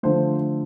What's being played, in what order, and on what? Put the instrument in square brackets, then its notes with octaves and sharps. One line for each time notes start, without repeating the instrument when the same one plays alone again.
[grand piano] D3 F3 A3 C5